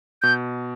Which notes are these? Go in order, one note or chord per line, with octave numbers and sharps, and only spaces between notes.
B2 G6